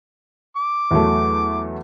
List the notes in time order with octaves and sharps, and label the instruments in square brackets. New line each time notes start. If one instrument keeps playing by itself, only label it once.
[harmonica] D6
[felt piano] E2 F#3 A3